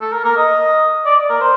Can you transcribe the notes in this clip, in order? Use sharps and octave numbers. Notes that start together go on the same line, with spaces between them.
A4
A#4
A#4
D#5
D5
A#4
C5